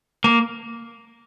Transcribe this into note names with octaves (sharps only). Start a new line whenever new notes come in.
A#3